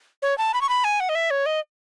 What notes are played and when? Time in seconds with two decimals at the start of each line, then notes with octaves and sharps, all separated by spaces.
0.22 C#5
0.38 A5
0.54 B5
0.61 C#6
0.69 B5
0.84 G#5
1.00 F#5
1.09 D#5
1.15 E5
1.31 C#5
1.46 D#5